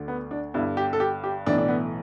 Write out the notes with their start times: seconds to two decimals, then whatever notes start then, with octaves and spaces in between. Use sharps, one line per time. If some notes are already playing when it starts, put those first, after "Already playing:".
Already playing: D2 D3
0.08 B3
0.31 D4
0.54 G1 G2 D3 E4
0.77 G4
0.93 A4
1.00 G4
1.24 G4
1.46 B1 A2 E3 D4
1.58 D4
1.68 B3